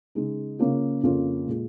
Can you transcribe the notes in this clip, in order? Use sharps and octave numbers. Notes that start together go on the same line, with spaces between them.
C#3 G#3 D#4
C#3 A#3 C#4 F4
F2 C#3 A#3 C#4 F4
A#2 G#3 F4